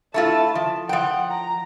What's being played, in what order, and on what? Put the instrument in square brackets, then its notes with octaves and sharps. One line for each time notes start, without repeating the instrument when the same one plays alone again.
[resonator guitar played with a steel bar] A3 E4 F4 [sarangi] A5
[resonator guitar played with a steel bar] F3
[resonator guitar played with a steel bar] F3 G5 [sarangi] F#5
[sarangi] A#5